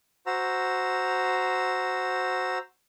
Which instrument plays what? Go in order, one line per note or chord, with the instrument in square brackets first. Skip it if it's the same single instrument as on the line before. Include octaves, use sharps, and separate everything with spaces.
[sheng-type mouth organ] F#4 C5 A#5 E6